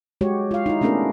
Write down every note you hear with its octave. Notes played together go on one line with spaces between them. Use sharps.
G#3 F#4 G4 C#5
F4 F5
D#4 E4
A3 B3 C#4 D4 G#4 A#4